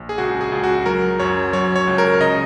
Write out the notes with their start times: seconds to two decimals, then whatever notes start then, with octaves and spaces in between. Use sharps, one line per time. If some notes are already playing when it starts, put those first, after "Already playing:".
Already playing: A#1
0.09 G#4
0.18 C#2 F#4
0.41 G#4
0.52 C#2
0.64 F#4
0.86 F#3 A#4
1.19 F#2 C#5
1.53 F#3 C#5
1.76 C#5
1.88 C#2
1.98 A#4
2.21 C#3 D#5